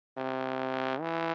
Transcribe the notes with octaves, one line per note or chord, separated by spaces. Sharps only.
C3
E3